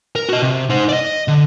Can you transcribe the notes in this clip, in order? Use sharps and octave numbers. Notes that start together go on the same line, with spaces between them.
A#4
F#4 D#5
C3
D#4 C5
D5 D#5
D3